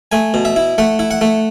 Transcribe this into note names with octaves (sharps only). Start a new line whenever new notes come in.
A3 G#5
B2
E5
E4
A3 F#5
E4
F#5
A3